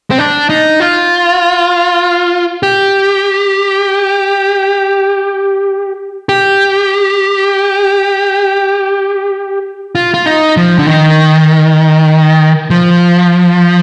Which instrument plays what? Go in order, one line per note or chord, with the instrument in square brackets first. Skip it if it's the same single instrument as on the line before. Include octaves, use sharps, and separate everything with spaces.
[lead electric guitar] C4
D4
D#4
F4
G4
G4
F4
F4
D#4
F3
D3
D#3
F3